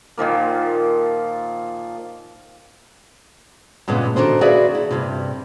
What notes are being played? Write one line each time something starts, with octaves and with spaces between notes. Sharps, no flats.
A#2 D#3 F3 A#3
G2 A#2 C#3 G#3 B3
D#3 D4 F#4 A4 C5
F#4 G#4 B4 D5 E5 F5
E4
G2 C3